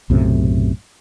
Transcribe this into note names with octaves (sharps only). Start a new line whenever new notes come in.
B1 F#2 A2 C3